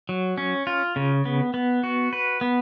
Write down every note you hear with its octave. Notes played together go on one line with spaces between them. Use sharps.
F#3
C#4
F4
C#3
B3
B3
F#4
B4
B3